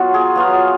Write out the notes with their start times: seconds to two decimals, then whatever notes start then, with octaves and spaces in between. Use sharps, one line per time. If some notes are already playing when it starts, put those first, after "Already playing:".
Already playing: F#3 B3 F4 F#4
0.14 G#4
0.35 F#3 B3 F4 F5